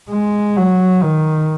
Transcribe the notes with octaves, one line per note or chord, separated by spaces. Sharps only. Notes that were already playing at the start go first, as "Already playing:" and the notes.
G#3
F#3
D#3